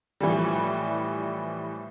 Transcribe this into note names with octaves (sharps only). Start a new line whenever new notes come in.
A2 E3 F3 G3